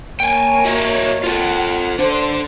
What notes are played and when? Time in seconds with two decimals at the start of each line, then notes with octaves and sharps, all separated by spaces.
0.20 A#3 C#5 G5 G#5
0.65 F#4 D#5 E5
1.23 F4 A4 F#5
1.99 D4 A4 C5